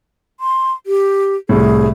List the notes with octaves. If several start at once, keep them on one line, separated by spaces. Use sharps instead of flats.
C6
G4
C2 A2 G#4